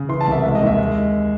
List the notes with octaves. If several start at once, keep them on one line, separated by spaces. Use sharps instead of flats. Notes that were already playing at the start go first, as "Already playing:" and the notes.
Already playing: C#3
E3 C6
A5
C2 E5
G#3 E5
D#5
D#2 E5
G#3